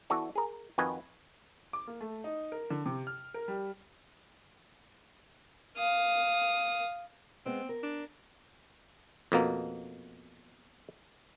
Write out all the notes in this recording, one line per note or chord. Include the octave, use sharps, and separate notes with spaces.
E3 B3 F#4 A4 D5
G#4 A#4
F2 D#3 F#4 B4 G#5
D6
A#3
A3
D#4
A#4
D3
C3
F6
A#4
G3
F5 D#6
G#3 B3 C4
A#4
D4
F2 B2 A#3